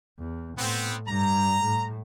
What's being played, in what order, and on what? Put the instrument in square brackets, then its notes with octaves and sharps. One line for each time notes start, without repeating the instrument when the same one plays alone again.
[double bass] E2
[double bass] A2 [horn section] B3 C4
[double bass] G2 G3 [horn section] A#5
[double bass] A2